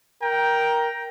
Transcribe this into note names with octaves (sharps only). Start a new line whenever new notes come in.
A#4 G5 A#5